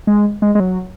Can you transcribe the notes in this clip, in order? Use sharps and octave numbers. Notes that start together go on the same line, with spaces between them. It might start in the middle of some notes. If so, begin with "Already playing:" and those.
G#3
G#3
G#3
F#3